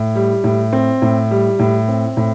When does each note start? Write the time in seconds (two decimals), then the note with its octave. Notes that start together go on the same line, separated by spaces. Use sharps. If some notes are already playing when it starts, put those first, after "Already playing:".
Already playing: A2
0.15 G3
0.44 A2
0.73 C4
1.02 A2
1.31 G3
1.59 A2
1.88 C4
2.17 A2